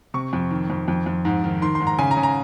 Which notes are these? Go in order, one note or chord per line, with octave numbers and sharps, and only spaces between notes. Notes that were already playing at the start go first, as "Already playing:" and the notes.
C3 C#6
F2
D#3
F2
F2
F2
G#2
D#3
D#3 C6
C6
G#2
A#5
C#3 G#5
A#5
C#3
A#5